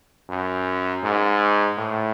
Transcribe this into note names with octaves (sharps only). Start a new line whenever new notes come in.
F#2
G#2
A2